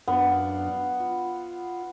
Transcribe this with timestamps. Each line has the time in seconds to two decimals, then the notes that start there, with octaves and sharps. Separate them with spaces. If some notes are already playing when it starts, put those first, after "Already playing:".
0.08 F#2 B3 D4 F5
1.00 F4